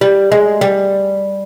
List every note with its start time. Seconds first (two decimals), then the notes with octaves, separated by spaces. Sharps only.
0.01 G3
0.32 G#3
0.61 G3